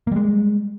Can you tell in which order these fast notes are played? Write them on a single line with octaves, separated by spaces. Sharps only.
A#3 G3 G#3